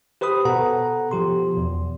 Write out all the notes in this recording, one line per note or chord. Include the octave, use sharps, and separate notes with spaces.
G4 B4 C5 B5 D#6
B2 A4 F#5 A#5
B2 F3 G4 C6
E2